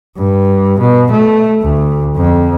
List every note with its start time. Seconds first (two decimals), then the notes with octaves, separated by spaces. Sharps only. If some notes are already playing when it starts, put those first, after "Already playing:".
0.17 G2
0.79 B2
1.11 A3
1.62 D2
2.16 F2